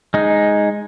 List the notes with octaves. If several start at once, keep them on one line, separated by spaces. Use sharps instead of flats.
G#3 D#4